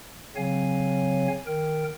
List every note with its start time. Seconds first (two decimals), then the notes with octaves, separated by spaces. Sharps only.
0.36 C#3 F#3 C4 C#5 F5 G#5
1.47 D#3 A#4 G5